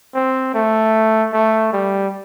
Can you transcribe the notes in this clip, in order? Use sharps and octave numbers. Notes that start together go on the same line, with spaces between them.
C4
A3
A3
G3